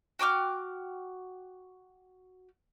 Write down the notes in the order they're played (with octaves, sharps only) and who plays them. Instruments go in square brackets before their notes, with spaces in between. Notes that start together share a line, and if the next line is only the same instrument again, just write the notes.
[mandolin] F#4 G5 D6 F6